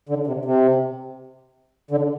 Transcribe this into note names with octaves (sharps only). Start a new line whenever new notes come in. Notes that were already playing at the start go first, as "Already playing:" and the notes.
D3
C3
C3
D3